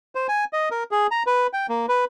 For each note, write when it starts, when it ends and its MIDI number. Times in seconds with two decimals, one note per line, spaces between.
0.15 0.27 72
0.29 0.45 80
0.53 0.69 75
0.71 0.84 70
0.91 1.07 68
1.11 1.23 82
1.27 1.47 71
1.53 1.67 79
1.69 1.86 58
1.88 2.05 71